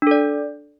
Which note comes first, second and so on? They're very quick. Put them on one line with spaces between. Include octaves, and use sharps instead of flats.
D4 A4 D5